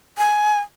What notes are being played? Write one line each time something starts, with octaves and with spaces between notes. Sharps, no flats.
G#5